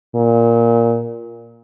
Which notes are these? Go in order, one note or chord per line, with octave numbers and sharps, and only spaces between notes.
A#2